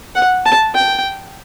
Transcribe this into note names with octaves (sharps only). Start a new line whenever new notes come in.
F#5
A5
G5